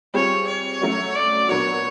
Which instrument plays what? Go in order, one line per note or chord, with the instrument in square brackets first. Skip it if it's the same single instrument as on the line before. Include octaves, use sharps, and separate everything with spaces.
[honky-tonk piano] G3 C4 F4 G#4 [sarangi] C#5
[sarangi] C#5
[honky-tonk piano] F#3 A3 C#4 F#4
[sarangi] D5
[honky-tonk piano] A#2 F#3 B3 D4 F#4 [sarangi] C#5